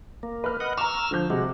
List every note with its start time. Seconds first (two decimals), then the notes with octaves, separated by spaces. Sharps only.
0.23 A#3
0.44 B4 F6
0.60 D#5 F#5
0.78 A#5 C#6 E6 F6
1.11 D3 F3 G6
1.30 C3 G#3 F#4